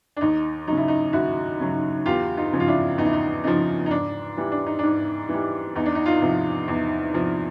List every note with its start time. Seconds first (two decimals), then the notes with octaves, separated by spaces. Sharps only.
0.17 D4
0.21 D#2 D#4
0.67 C#3 F#3 D#4
0.77 E4
0.88 D#4
1.13 D#2 E4 F#4
1.60 C#3 F#3
2.06 E2 F4 G4
2.37 D#4 F4
2.53 C#3 F3
2.60 F4
2.67 D4 E4
2.98 E2 D#4
3.05 E4
3.13 D#4
3.44 C#3 F3 D#4
3.86 D#4
3.91 G#2 D4
4.37 E3 G3
4.52 D4
4.66 D#4
4.79 G#2 D4
5.29 E3 G3
5.76 E2 D#4
5.86 D4
5.95 D#4
6.06 D#4 F4
6.21 C3 F3
6.68 E2
7.14 C3 F3